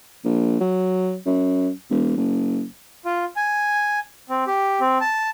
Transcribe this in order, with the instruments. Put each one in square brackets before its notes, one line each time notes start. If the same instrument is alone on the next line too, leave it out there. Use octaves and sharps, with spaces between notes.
[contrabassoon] A#1
F#3
F#2
E1
F#1
[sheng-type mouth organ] F4
G#5
C4
G4
C4
A5